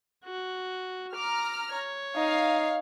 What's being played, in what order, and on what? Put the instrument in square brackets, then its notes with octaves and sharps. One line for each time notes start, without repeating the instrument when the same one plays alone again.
[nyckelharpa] F#4
[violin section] A#5 F6 [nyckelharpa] D6
[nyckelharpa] C#5
[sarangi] D#4 [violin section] F5